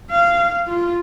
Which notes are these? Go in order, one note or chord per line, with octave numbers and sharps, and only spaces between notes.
F5
F4